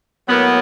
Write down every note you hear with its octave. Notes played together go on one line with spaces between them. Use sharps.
A2 F#3 A#3 B3